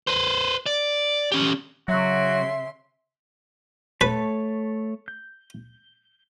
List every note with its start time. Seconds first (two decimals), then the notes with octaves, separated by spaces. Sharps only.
0.07 B4 C5
0.66 D5
1.32 C#4 G4
1.88 C#3 F#3 F#4 E5 C6
4.01 A3 B4 C#5 A5
5.08 G6